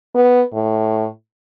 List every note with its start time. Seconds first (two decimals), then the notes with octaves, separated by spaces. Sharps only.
0.15 B3
0.53 A2